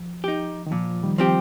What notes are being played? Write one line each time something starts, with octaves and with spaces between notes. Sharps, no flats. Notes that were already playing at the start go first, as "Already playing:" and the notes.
Already playing: F3
D#4 G4
D#3
A#2 F3
D#3 G3
F3 C4 G4